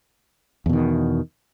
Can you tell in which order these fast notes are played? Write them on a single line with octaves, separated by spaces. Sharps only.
E2 B2 D#3